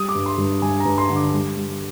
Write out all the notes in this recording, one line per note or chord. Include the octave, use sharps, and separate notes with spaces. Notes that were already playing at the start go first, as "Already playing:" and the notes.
Already playing: G3 D#6
D6
G2
C6
G2
G2 G#5
A#5
G2
C6
D3
D6
G3
G3